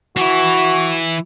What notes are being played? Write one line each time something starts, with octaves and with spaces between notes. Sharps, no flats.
E3 E4 F#4